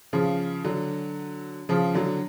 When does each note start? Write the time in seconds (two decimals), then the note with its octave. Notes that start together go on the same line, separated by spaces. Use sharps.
0.13 C#3 F3
0.64 D3 F#3
1.69 C#3 F3
1.95 D3 F#3